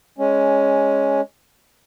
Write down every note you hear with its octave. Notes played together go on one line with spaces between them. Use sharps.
G#3 C#4